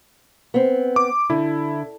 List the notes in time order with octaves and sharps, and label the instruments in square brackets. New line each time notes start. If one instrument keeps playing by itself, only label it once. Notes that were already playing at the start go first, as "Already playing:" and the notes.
[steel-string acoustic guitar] B3 C4
[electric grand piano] D6
[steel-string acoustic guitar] D3 [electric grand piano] E4